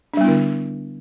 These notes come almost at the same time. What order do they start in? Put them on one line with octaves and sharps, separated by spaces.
D4 G3 B3 E4 D3